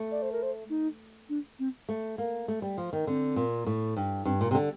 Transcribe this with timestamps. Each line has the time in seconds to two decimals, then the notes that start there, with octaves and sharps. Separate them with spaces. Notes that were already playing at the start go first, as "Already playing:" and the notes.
Already playing: A3
0.11 D5
0.22 C5
0.32 A#4
0.42 C5
0.70 D#4
1.29 D4
1.59 C4
1.89 A3
2.18 A#3
2.48 A3
2.62 G3
2.78 F3
2.93 D#3
3.07 D3 C4
3.36 A#2
3.66 A2
3.96 G2
4.25 G2 C4
4.41 A#2
4.51 C3
4.55 D3